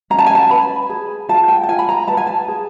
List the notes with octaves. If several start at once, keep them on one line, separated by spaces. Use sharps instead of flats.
C#4 A#5
A5
G#5
A5
B4 B5
G#4
F4 A5
G5
A5
F4 G#5
B5
A#5
B4 A5
G#5
A5
G#4